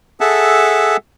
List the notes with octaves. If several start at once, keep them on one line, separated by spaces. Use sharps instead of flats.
G#4 A4 E5 F#5 A5